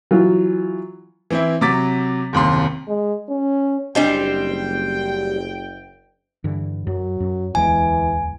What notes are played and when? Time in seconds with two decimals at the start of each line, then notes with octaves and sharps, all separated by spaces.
0.11 E3 F#3 F4
1.30 E3 C4 E4
1.61 C3 F#3 D6 A6 B6
2.33 F#1 D#2 C3 C6
2.88 G#3
3.29 C#4
3.95 F#1 G3 C4 D4 G4 D#5 G5 A5
6.44 G2 D3 E3
6.87 F#2 F#3
7.20 F#2
7.55 D1 E2 E3 G#3 G#5